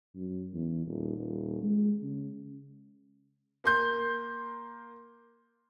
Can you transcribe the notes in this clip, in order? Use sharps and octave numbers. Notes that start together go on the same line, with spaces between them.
F#2
E2
D#1
D#1
G#3
C#3
A#3 C6 G6